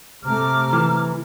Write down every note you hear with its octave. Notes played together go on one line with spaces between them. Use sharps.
C3 A3 A#5 D6 F6
E3